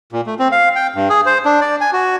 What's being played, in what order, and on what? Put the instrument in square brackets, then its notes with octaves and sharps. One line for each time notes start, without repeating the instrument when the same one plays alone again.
[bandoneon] A#2
A3
C4
F5
G5
G2
G#4
C5
D4
D5
G#5
F#4